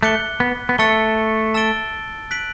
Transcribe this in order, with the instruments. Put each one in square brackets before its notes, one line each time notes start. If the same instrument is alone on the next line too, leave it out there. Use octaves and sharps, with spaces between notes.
[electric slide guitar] A3 [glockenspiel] D6 F#6 C#7 G7
[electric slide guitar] B3
B3
[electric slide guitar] A3 [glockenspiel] E6 A6 C#7 G7
[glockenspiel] A5 E6 A6 D7 G7
F#6 B6 D7 F#7